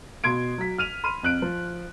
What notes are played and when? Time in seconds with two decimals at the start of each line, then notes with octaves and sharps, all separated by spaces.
0.24 B2 C6 G#6 D7
0.58 F#3 B6
0.78 F6 D#7 F7
1.04 B5 C6 F6 D#7
1.23 F2 F#6 D7
1.42 F3